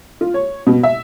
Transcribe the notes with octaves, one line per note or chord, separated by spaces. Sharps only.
F4
C#5
B2
E5